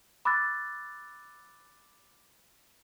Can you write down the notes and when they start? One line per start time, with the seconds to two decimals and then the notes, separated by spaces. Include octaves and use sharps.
0.25 B5 D6 E6 F#6 A6